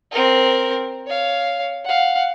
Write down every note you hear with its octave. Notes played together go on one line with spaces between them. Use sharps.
C4 A#4
C#5 F5
F5 F#5